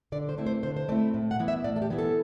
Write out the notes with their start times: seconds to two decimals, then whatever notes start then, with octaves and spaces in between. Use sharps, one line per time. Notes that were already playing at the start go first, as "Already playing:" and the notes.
0.12 D3 D5
0.29 C5
0.38 A3 C4 E4
0.46 C5
0.63 D3 C5
0.76 C5
0.89 A3 C4 E4 D5
1.14 A2
1.31 F#5
1.39 E3 B3 E4
1.48 E5
1.64 A2 D5
1.76 A4
1.82 G4
1.90 E3 B3 E4
1.99 A4